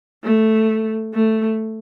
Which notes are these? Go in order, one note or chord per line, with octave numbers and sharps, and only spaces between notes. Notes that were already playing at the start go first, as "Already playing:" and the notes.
A3
A3